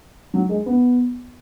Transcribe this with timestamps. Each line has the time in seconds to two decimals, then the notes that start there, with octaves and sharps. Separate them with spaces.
0.34 F#3
0.49 G#3
0.66 B3